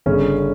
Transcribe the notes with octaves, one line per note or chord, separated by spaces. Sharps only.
G1 C#3 C#4